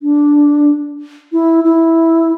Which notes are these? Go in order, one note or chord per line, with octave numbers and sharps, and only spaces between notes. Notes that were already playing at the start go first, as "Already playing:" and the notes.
D4
E4
E4